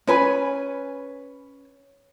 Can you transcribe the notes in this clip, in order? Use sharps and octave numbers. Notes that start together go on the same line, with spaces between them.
C#4 B4 G#5 B5